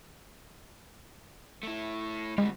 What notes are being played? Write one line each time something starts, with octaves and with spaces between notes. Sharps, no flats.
A3 E4
D2 G3 G#3